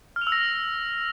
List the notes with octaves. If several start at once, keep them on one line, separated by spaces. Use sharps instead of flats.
F6
F7
E6
A#6